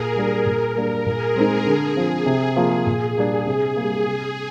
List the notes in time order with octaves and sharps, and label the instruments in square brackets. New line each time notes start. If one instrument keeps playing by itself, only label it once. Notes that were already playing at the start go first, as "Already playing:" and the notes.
Already playing: [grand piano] A#2 [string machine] G#4 A#4
[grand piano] G3 A#3 D4
A#2
G3 A#3 D4
[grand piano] A#2 [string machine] G#4
[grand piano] G#3 C4 D#4
D3
F3 C4
[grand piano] C3 [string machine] G#4
[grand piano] F3 A#3
A#2
G3 A#3 D4
C3
G3 A#3
C3